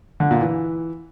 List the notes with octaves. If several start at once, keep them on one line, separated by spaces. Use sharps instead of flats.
D3
A#2
E3